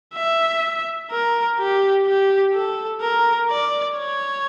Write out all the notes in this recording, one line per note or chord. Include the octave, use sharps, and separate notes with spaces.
E5
A#4
G4
G4
A4
A#4
D5
C#5